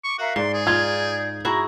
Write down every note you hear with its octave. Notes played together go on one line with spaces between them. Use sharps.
C#6 D6
F#4 A#4 E5 F5
G#2 D5 C6
G#4
D#4 F4 D5 G6 G#6
E4 F#4 G#4 A#5